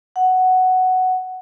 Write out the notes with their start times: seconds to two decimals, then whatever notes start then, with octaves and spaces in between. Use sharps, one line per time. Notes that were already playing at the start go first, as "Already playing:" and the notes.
0.16 F#5